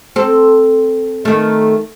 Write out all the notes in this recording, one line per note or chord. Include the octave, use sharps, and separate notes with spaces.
C4 A4
D#3 A3